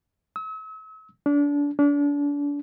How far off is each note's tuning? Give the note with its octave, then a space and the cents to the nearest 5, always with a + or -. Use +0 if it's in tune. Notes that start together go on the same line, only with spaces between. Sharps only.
E6 -40
D4 -30
D4 -35